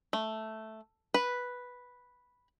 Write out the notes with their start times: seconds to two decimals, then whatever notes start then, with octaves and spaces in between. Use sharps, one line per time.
0.13 A3
1.14 B4